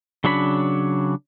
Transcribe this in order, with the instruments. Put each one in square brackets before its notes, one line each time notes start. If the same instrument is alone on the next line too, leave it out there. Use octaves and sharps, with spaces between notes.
[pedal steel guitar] C#3 F#3 D4 C#5 B5